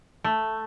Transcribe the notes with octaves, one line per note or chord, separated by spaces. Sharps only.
A3